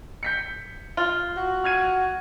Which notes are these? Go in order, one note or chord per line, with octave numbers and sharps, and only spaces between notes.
G6 B6 C#7
F4
F#4
F6 G#6 D#7